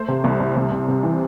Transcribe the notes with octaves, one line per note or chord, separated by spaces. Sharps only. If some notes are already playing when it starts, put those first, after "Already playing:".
Already playing: A3 C5
C3
C2
C3
C2
C3
C3
E3